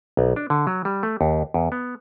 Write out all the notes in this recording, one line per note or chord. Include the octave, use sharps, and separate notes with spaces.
B1
D4
D3
F#3
G3
A3
D#2
E2
B3